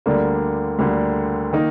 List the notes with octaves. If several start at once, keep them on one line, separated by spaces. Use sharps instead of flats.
D2 D3 G3 A#3
D2 D3 G3 A#3
D#3 A#3 D#4